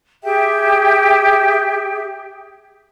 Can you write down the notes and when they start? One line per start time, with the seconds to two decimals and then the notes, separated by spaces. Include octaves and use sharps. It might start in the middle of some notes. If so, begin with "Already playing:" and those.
0.23 G4 G#4 E5 G5